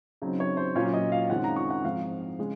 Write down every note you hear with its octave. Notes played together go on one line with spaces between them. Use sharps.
C#3 F#3 C4 D#4
C#5
C5
A#2 F#3 C#4 F4 C#5
D#5
F5
F#2 D#3 G#3 C4 F4 F#5
A#5
C#6
F#5
G#2 F3 C4 F5
C#3 G#3